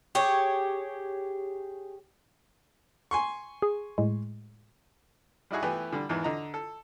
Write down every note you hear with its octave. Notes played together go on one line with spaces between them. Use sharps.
G4 G#4 C#5
G#5 C6 C#6
G#4
A2 G#3
G3 D#4 E4 F#4 G#4
E3 A3 B3 G4 B4 G#5
D3 G3
E2 G#2 D#3 E3
D3 D#5 A#5
A4